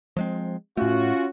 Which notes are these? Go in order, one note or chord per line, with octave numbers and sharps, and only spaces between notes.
F3 G#3 C4
A2 A3 C#4 F4 F#4